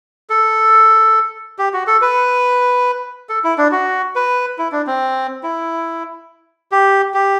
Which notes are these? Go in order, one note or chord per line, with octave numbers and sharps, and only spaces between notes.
A4
G4
F#4
A4
B4
A4
E4
D4
F#4
B4
E4
D4
C4
E4
G4
G4